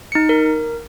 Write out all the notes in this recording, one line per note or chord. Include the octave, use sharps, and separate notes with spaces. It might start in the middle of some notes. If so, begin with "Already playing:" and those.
D#4 C#7
A#4